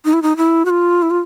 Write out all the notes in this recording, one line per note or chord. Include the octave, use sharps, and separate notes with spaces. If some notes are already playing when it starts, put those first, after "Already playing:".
D#4
E4
D#4
E4
F#4
F4
E4
F4